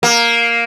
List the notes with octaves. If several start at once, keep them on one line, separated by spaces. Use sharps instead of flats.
A#3